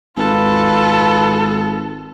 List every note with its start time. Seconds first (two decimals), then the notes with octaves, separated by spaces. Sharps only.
0.17 G#1 F4 A4 B4